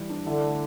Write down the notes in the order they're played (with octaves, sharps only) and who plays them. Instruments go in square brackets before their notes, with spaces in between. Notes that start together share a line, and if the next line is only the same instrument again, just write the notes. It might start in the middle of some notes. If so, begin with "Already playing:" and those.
Already playing: [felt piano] E3 G3
D4
[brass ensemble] D3 [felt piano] E4
[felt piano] A3